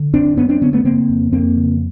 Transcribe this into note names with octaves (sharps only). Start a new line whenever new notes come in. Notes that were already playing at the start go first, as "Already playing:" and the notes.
Already playing: D3
F#2 C4 D4
F#2 B3 C#4
C4 D4
D3 B3 C#4
A3 B3
C#3 A#3 C4
F2
F2 A#3 C4
C#3